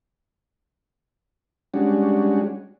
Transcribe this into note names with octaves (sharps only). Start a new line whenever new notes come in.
G3 G#3 C#4 D4 F#4